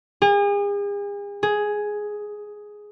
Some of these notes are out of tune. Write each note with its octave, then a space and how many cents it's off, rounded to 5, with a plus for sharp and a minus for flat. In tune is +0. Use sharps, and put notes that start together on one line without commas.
G#4 -40
G#4 +5